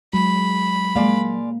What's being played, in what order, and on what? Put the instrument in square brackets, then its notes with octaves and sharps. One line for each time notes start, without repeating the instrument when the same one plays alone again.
[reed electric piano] F#3 [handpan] G#3 [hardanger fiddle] B5
[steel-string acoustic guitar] G#3 D5 F5 [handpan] A#3